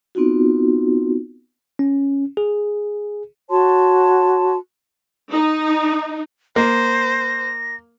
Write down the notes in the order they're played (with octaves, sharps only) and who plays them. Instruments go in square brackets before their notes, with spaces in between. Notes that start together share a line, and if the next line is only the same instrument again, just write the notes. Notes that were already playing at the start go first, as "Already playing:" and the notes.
[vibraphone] B3 C4 D#4 F4 F#4
[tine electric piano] C#4
G#4
[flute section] F#4 C#5 A5 C6
[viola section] D#4
[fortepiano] A#3 [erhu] C5 [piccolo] A#6